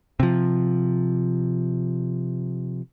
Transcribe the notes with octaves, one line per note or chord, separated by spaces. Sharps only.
C3 F3